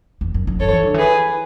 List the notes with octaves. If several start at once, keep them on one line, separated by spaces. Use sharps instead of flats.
E2
F#2
F#2
F#3 A4 C#5
E3
D3
E3 G#4 B4